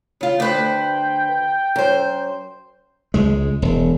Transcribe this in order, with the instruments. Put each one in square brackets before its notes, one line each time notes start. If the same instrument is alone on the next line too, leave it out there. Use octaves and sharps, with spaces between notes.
[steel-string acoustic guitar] C#3 F4
[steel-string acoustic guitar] D2 B4 C5 [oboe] G5
[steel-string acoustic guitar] F#2 C5
[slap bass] C#2 G#3
E1